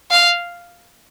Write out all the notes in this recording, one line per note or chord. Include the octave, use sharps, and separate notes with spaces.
F5